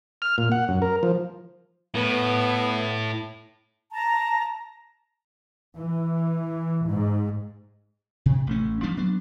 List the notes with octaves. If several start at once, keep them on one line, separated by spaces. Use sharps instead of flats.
F6
A#2
F#5
F#2
A#4
F3
A2 B3
A5 A#5
E3
G#2
C3
A1 A3 C#4
F3 G3 B3 D4
F#3 B3 D4